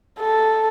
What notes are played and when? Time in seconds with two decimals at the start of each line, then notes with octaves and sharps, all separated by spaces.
0.20 A4